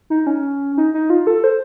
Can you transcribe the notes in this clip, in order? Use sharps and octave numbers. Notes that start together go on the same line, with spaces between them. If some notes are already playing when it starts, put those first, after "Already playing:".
D#4
C#4
D#4
D#4
F4
A4
C5